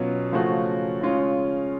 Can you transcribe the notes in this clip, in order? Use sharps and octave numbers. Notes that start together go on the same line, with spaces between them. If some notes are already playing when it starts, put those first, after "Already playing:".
Already playing: B2 F#3 C#4 F4
C#3 F3 A3 C#4 F#4
C#3 G#3 C#4 F4